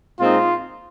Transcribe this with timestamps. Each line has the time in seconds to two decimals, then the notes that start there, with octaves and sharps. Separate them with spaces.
0.19 A#2 G#3 C4 D#4 F4